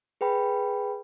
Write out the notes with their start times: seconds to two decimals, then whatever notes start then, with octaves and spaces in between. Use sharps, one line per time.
0.21 G#4 B4 G5 B5